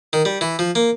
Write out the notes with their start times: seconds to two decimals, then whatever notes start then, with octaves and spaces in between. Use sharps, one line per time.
0.13 D#3
0.25 G3
0.41 E3
0.59 F3
0.75 A#3